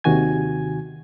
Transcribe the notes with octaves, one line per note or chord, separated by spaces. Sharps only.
D#2 C3 D#3 F#4 G#5 G#6